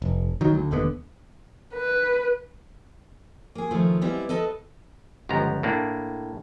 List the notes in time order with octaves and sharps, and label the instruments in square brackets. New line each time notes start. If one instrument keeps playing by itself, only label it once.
[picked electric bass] F1
D#3 F#3
D2
E1 D#2 D3 B3
[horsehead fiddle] B4
[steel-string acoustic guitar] A#3 G#4
D#3 F3 G#3 A3 F4
G3 G#3 B3 C4 E4
A4 B4 D#5 A5
[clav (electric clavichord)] G1 C#2 F3 B3 A#5
A2 A#3 D4